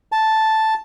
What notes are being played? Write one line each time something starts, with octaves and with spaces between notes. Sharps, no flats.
A5